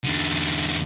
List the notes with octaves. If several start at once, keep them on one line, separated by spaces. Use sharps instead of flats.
E2 D3